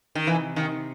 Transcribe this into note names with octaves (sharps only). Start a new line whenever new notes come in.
D#3
C3 E3
D#3